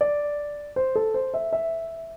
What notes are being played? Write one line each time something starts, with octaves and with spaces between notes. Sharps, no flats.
D5
C5
A4
C5
E5
E5